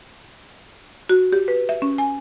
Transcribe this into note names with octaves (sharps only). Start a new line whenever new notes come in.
F#4
G4
B4
E5
C#4
G#5